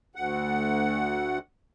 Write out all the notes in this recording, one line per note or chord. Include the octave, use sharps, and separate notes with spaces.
D2 F#5